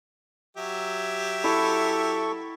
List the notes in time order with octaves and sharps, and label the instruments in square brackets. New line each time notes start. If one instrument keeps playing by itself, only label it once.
[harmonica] F#3 G4 E5
[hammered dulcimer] E4 [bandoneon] A4 C#6